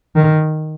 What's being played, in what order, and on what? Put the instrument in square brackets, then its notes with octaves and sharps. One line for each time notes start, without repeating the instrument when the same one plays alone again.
[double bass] D#3